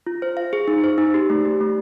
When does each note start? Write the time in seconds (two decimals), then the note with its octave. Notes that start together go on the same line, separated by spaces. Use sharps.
0.07 F4
0.22 C5
0.37 F5
0.53 G#4
0.68 D#4
0.84 C5
0.98 D#4
1.14 G4
1.30 A3
1.45 G4
1.60 A3